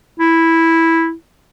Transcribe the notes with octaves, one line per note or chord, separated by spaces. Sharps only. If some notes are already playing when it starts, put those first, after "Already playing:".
E4